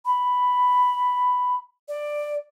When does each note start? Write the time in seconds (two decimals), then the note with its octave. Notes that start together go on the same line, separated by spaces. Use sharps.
0.05 B5
1.88 D5